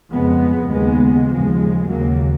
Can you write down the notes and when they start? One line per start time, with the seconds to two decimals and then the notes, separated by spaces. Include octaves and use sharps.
0.12 F2 C#3 G#3 B3
0.72 D#2 C#3 G#3 B3
1.30 D#2 C#3 F3 G#3
1.88 D#2 C#3 F#3 A#3